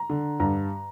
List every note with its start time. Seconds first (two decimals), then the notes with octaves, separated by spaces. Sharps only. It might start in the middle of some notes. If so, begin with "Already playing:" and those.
Already playing: A#5
0.10 D3
0.40 G2 A#5